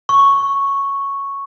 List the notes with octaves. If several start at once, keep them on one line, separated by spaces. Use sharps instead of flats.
C#6